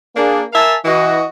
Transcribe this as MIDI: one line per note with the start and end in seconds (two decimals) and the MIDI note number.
0.16 0.42 58
0.16 0.42 62
0.16 0.42 68
0.53 0.75 70
0.53 0.75 76
0.53 0.75 77
0.53 0.75 80
0.53 0.75 81
0.85 1.25 52
0.85 1.25 66
0.85 1.25 75